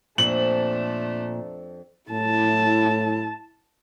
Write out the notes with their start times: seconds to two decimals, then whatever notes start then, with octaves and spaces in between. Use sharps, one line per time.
0.18 F2 A#2 A3 D4 F#7
2.10 A2 E4 A5